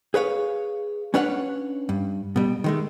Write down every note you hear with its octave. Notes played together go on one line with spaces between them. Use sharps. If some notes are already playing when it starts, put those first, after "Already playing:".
G#4 B4 C#5 F5
C#4 D4 B4 C#5 F5 F#5
G2
B2 G3
D#3 G#3 A3